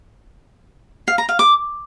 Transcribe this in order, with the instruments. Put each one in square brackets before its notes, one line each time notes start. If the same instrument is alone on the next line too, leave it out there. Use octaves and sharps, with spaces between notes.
[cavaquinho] F5
A#5
F5
D6